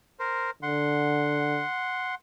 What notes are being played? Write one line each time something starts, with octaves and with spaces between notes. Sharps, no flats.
A#4 C5
D3 F#5 C6